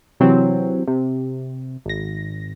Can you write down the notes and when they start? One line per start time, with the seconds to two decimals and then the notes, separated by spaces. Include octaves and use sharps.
0.20 C3 E3 F#3 C4
0.88 C3
1.85 G#1 A#6